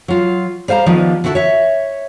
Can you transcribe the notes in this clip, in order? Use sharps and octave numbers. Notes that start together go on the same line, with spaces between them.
F#3 F4
G3 C5 F5 G5 A#5
D#3 F3 G3 A#3 B3
D3 E4 F#4 G4 A4
C#5 E5